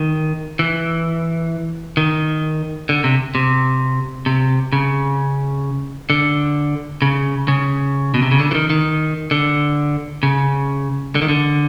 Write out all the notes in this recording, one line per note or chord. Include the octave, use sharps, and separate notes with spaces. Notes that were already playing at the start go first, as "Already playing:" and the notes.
Already playing: D#3
E3
D#3
D3
C3
C3
C3
C#3
D3
C#3
C#3
B2
C3
C#3
D3
E3
D#3
D#3
D3
C#3
D3
D#3
D3